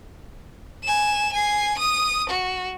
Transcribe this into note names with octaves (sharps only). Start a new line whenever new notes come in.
G#5 E7
G#5 C7
D#6 D#7
F#4